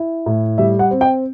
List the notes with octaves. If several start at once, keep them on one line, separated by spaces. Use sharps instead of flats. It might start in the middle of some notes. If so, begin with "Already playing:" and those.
Already playing: E4
A2
G3 E5
F#5
C4
G5